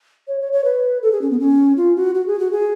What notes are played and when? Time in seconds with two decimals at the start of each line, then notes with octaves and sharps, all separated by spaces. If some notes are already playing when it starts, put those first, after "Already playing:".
0.28 C#5
0.41 C#5
0.52 C#5
0.64 B4
1.02 A4
1.12 G#4
1.21 C#4
1.31 B3
1.39 C#4
1.77 F4
1.96 F#4
2.15 F#4
2.27 G#4
2.40 F#4
2.52 G#4